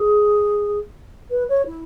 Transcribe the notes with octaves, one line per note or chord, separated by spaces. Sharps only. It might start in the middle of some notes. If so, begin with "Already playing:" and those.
Already playing: G#4
B4
C#5
E4